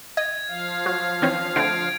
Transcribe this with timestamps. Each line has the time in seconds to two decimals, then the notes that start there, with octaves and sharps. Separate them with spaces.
0.17 D#5 G#6
0.48 F3 F5
0.86 F#3
1.22 E3 C4 C#4
1.56 D3 A3 C4 G#6 D7